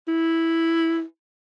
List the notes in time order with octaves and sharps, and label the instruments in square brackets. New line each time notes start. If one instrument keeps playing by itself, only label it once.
[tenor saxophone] E4